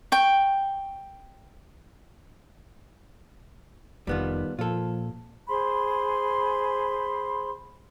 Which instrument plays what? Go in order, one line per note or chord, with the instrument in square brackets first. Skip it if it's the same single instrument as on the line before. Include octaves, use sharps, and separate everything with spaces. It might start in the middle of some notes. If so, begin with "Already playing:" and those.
[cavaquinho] G5 C#6
[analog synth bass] F1 [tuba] D#3 [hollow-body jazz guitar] G3 B3 F4
[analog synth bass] A#2 [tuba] F3 [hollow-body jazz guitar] F4 A4
[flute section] G#4 C5 B5 C6